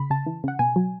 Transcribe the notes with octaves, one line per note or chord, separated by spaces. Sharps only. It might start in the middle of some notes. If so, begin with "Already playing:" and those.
Already playing: C#3 B5
C#3 A5
E3
C#3 F#5
B2 G#5
F#3